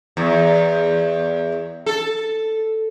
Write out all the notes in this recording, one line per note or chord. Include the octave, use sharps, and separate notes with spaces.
E2
A4